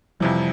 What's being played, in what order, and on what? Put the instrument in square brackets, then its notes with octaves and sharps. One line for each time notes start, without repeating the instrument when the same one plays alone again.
[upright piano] F2 C3 E3 [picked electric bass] F3 G3